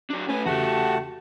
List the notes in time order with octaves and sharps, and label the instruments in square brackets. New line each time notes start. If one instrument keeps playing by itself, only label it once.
[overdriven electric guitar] F#3 D4
[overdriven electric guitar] A3 B4 [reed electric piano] C#4 [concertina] G#5
[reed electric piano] E2 C#3 [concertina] A3 F#5 A5 [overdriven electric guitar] F#4 G4